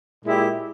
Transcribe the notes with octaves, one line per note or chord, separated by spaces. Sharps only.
A#2 G#3 E4 G4